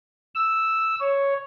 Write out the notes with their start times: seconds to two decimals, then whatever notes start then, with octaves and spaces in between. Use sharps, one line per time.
0.35 E6
1.00 C#5